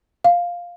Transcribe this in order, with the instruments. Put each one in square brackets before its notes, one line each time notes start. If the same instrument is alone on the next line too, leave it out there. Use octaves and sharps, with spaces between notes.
[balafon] F5